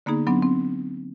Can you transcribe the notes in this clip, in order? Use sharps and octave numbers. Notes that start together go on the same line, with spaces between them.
D3 A#3 B3 D#4 G#4
F#3 B3 C4 D4
C4